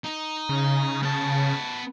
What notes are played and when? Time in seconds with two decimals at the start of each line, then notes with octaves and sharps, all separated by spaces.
0.04 D#4
0.49 C#3
1.02 B3 A5